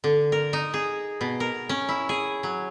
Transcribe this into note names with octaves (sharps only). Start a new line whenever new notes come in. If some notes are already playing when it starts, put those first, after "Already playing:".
D3
A#4
D#4
G#4
B2
A#4
C#4
E4
G#4
F#3